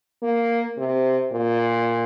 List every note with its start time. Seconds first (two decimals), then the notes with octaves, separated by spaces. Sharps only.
0.23 A#3
0.78 C3
1.33 A#2